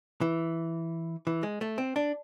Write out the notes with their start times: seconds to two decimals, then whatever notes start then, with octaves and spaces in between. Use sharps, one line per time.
0.21 E3
1.27 E3
1.43 G#3
1.61 A3
1.78 C4
1.96 D4